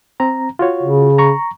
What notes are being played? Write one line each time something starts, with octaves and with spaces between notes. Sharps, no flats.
C4 A#5
F4 F#4 C#5
C#3
A#5 C#6